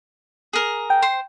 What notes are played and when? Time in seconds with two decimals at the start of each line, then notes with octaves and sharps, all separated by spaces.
0.53 G#4 A#4
0.90 G5
1.02 C5 C6